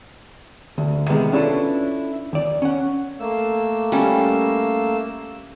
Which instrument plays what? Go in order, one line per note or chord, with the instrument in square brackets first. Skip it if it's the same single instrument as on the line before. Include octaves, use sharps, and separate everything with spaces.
[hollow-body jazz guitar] D2
C3 D#3 G#3 B3
C#4 D4 E4 F4 A4 B4
D#2 D5
C#4 F#5
[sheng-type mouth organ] A3 A#3 E6
[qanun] G3 C#4